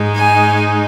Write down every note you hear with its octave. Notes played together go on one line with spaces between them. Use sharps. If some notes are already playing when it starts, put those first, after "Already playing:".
Already playing: G#2 G#3 D#4
G#5